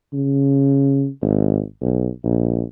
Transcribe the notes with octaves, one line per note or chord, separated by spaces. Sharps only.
C#3
G#1
B1
A#1